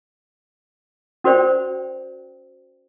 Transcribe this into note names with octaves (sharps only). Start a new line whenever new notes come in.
C#4 F#4 A#4 C5 D5 G5